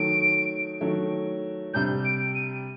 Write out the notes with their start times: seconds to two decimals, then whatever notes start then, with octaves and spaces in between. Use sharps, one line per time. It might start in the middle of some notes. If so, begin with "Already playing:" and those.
Already playing: D#3 F#3 A3 D7
0.81 D#3 F#3 A3
1.73 C3 G3 D4 G6
2.05 D7
2.34 D#7